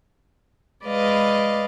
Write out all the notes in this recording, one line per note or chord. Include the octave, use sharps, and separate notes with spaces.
G#3 B4 D5 D#5 F5